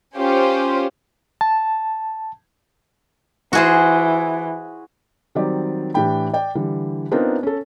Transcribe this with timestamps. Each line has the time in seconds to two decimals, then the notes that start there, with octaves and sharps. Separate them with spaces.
0.17 C#4 F4 G4 C5
1.41 A5
3.53 E3 F#4 G#4 C5
5.35 D#3 F#3 G3 C4 G4 D5
5.94 A2 E3 D4 G4 G5 B5
6.34 D5 G5
6.55 D3 E3 G3
7.11 B3 C4 D4 D#4 F4 A#4
7.43 C#4 A4